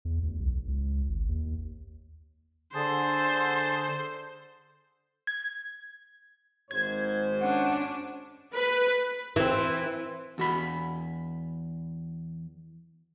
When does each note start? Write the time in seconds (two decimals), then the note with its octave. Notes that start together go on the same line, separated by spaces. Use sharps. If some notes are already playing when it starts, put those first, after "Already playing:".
0.05 E2
0.23 D2
0.39 B1
0.68 C#2
1.09 G#1
1.29 D#2
2.75 D3 G#4 C5 A5
5.27 G#6
6.71 G#1 G#2 C5 G#6
7.40 C#4 D4 F#5
8.55 B4
9.36 E3 C4
10.38 E2 F#4 B5